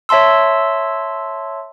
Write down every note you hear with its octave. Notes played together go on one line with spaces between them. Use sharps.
C#5 E5 A5 C6 E6